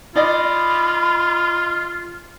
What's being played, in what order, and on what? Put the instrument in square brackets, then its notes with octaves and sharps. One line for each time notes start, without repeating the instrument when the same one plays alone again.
[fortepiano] D#4 D5 D#5 [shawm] F4 [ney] B5